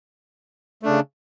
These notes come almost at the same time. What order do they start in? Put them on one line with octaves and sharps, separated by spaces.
A3 D4 C#3